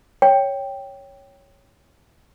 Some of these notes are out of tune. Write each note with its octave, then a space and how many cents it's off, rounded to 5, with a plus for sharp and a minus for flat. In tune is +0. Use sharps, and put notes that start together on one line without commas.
C#5 +0 G5 +0